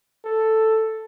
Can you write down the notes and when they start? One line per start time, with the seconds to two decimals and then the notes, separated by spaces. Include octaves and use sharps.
0.25 A4